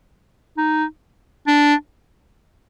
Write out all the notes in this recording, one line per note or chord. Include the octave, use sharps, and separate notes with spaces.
D#4
D4